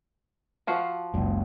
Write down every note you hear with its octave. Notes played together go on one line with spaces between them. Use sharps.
F3 F#4 F5
F#1 C#2